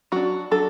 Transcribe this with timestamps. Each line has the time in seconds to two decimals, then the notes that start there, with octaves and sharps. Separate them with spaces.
0.12 F#3 D4 F#4
0.51 F#3 D4 A4